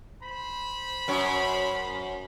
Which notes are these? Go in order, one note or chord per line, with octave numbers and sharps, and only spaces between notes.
C5 B5
F#2 C#5